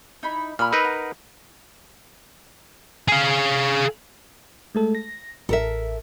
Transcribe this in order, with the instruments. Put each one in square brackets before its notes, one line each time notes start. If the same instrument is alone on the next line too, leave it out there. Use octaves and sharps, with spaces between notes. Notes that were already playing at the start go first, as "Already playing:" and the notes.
[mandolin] D#4 E4 B5
[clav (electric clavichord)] A#2 [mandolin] B5 E6 F6
[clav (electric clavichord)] D#4 A#4 B4
[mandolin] F#5
[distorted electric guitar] G#4 F5
[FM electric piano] G#3 A3 A4
A#6
[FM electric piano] A1 [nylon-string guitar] A4 A#4 E5